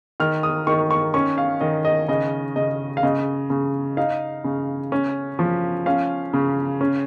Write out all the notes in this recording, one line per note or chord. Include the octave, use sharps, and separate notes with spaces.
D#3 F6
D#6
D#3 C#6
C#6
C#4 C#6
F5
D#3 D#5
D#5
C#3 D#5
C#3 D#5
F5
C#3 D#5
C#3
D#4 F5
C#3
C#4
F3
C#4 F5
C#3
C#4